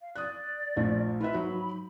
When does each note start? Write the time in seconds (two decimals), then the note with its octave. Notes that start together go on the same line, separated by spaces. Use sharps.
0.01 F5
0.16 D5 D#6 F#6
0.76 A#1 F3 A3
1.20 F4 B4 E5 B5
1.33 G#2 F#3